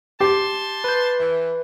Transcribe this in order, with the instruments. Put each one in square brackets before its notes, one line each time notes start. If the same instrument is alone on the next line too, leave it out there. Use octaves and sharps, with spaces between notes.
[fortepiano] G4 [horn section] A5 C6
[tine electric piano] B4 G6
[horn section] E3